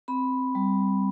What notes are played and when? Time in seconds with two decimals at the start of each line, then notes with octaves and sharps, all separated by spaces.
0.08 C4 B5
0.55 G3